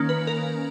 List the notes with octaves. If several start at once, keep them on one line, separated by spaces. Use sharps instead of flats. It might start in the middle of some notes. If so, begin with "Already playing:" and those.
Already playing: D#3 A#3 C#4
B4
A#4